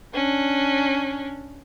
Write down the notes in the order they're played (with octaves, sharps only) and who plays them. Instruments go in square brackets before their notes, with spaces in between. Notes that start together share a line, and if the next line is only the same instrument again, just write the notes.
[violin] C#4 D4